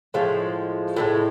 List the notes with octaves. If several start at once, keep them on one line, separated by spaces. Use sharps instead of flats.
A2 F3 G#3
A2 F3 G#3